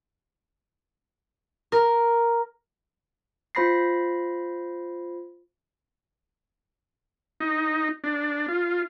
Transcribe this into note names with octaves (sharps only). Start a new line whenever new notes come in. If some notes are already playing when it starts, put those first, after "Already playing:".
A#4
F4 C5 B5 A#6 C7
D#4
D4
F4